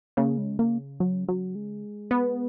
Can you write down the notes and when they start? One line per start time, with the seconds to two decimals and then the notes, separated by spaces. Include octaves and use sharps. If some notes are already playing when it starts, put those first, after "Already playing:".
0.17 C#3 A#3
0.38 G#3
0.59 A#3
1.00 F#3
1.28 F#3
1.55 G#3
2.11 B3